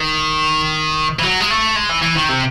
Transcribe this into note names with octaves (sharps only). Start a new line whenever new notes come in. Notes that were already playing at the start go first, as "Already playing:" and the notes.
Already playing: D#3
E3
F#3
G#3
A3
G#3
E3
E3
D#3
C3